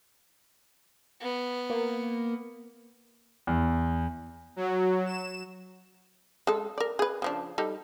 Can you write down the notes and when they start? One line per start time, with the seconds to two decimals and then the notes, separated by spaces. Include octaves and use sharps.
1.21 B3
1.70 A#3
3.47 E2
4.56 F#3
5.06 E7
6.47 G#3 A4
6.78 A#4 D5
6.99 G#4 B4
7.22 C#3 F3 D4
7.58 G3 D#4 A4